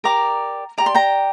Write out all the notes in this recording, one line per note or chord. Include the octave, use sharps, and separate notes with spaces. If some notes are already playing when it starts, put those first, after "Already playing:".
G4 A#4 D5 A#5 D6
G4 D5 A#5
C6
G5 A#5